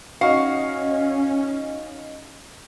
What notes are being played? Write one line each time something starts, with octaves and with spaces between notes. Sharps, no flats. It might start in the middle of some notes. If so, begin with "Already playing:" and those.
C#4 D#4 F#4 F5